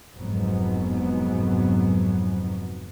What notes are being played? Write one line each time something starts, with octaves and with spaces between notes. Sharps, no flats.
F1 F2 G#2 F#3 B3